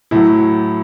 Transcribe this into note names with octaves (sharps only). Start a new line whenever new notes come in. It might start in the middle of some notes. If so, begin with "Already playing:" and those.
A2 F#3 E4